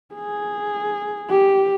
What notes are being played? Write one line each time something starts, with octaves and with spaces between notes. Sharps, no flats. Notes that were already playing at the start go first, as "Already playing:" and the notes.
G#4
G4